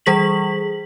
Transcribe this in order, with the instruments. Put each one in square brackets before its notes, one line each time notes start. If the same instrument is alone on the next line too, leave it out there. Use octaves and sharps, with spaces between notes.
[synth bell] E3 G3 G#4 B6 F#7